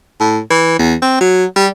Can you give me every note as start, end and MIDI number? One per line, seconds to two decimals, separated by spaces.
0.20 0.39 45
0.50 0.78 52
0.79 0.94 40
1.02 1.18 60
1.20 1.45 54
1.56 1.68 55